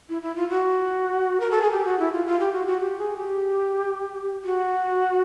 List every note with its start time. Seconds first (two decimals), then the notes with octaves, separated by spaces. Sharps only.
0.09 E4
0.22 E4
0.36 F4
0.50 F#4
1.40 A#4
1.51 A4
1.62 G#4
1.72 G4
1.85 F#4
1.99 E4
2.13 F4
2.26 F4
2.40 G4
2.53 F#4
2.67 F#4
2.81 G4
2.98 G#4
3.17 G4
4.44 F#4